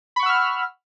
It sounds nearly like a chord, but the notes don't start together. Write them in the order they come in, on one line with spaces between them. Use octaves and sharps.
B5 C#6 F#5 E6 F6